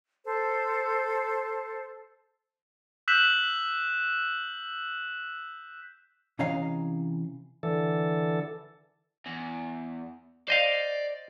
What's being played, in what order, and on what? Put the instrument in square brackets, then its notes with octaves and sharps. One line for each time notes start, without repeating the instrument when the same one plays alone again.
[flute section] A4 C5
[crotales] E6 F#6 G6 B6 E7 F#7
[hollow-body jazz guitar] C3 E3 C#4 D#5 F5 A#5
[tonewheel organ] D3 E3 A4
[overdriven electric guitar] E2
[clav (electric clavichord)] C5 D#5 F5 [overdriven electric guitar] D5